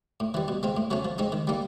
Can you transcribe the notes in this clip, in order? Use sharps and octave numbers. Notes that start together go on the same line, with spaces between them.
A2
E3 G3
B2
G#3 C4 F4
A2
F#3 A3 C#4
F3
G#3 C4 D#4
D#3
G3 A#3 D#4